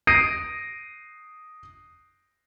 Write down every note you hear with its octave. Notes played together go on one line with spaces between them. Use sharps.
D#6 A#6 C7 D7 D#7